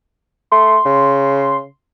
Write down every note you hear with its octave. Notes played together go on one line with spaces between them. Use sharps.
A3 C6
C#3